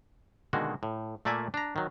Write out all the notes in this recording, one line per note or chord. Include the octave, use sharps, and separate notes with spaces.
B2 D3 D#3 G#3 A#3 F#4
A2
A#2 A3 A#3 D5 E5 G#5
D4 A#5
D#3 F#3